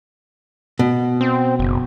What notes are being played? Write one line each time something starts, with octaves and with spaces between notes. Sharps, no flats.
B2
C4
F#1